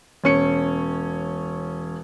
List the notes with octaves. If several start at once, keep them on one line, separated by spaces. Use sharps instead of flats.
E1 C#4 C#7